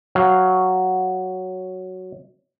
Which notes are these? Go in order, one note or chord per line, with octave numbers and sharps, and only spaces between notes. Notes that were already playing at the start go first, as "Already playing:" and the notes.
F#3 F5